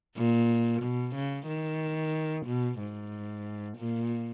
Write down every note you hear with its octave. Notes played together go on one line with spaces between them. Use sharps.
A#2
B2
C#3
D#3
B2
G#2
A#2